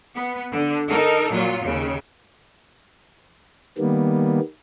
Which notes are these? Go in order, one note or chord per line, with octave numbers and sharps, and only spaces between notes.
B3
D3
D#4 A4 A#4
A#2 F#3 F4
D#2 C#3
D#3 G3 A#3 B3